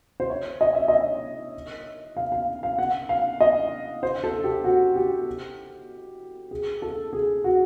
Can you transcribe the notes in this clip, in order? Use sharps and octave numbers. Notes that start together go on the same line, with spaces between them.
C5
C#5
D#5
E5
D#5
F5
F5
F5
F#5
F5
D#5
C5
A4
G4
F#4
G4
G#4
A4
G#4
F#4